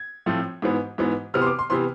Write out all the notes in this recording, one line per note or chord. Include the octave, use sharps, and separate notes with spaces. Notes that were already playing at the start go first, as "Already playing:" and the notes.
Already playing: G#6
A2 F3 A3 C4
G#2 E3 B3
G#2 E3 B3
C3 E3 B3 F6
C6
D6
C6
C3 E3 B3 C6